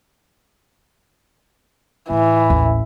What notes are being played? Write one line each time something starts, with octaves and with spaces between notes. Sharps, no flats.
A2 E3
A1 D#2